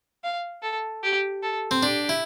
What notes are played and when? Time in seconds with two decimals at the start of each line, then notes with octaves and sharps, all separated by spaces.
0.24 F5
0.62 A4
1.03 G4
1.43 A4
1.71 C4
1.83 D4 G4
2.09 E4